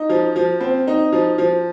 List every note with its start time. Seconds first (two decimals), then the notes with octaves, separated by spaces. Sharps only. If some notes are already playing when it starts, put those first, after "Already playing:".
Already playing: D#4
0.10 F3
0.36 F3
0.61 C4
0.88 D#4
1.13 F3
1.38 F3